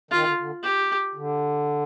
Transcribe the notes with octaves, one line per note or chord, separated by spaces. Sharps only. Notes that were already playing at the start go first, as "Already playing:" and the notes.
D#3 F4
D3
D3
G4
D3